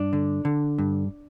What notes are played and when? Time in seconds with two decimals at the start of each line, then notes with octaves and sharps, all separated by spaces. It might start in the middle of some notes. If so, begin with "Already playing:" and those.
Already playing: G2 D4
0.13 D3
0.45 D3
0.78 G2